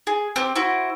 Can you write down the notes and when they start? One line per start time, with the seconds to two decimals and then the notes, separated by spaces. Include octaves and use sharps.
0.07 G#4
0.36 C4 G4
0.56 E4 F#4 C5